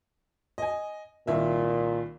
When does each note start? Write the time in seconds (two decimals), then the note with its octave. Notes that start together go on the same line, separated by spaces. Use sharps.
0.58 D#5 G#5
1.27 C2 A#2 D#3 E5